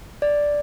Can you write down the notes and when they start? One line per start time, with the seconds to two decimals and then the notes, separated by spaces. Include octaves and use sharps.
0.22 D5